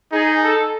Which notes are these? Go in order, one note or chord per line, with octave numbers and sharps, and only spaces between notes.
D#4 G#4
A4